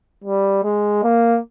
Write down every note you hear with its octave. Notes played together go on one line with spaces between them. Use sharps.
G3
G#3
A#3